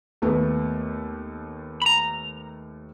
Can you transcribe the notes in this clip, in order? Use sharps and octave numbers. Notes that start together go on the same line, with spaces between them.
D#2 A3 B3
A#5 B5